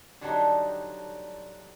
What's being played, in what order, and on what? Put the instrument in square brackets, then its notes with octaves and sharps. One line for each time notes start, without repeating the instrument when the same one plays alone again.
[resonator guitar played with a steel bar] D3 F#3 G3 D4 D#4